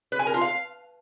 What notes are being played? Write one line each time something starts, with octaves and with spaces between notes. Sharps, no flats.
B4
G#5
A#4
F4
F5